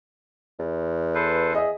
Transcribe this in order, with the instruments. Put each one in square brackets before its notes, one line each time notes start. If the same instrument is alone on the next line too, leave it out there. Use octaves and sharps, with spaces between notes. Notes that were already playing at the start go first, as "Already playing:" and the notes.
[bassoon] E2
[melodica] A4 B4 C5
[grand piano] G#4 D#5 E5